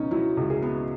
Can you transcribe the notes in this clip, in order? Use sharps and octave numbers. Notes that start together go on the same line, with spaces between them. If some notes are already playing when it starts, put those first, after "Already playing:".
Already playing: C#2 B2 B3 C#4 D#4
F#3 E4
C#2
G#4
B3